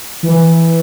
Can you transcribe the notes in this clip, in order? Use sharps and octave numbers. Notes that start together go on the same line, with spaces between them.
E3